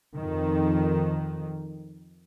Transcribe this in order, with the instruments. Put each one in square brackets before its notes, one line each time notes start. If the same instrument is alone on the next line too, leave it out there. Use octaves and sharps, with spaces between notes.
[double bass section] F2 D#3